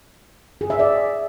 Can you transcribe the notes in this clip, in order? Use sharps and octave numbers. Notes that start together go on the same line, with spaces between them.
G#4
E5
D5